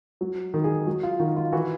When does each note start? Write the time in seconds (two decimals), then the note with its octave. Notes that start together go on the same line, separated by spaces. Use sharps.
0.21 F#3
0.54 D#3
0.64 G#4
0.87 F#3
1.03 F4
1.20 D#3 F#4
1.36 F4
1.52 E3 F#4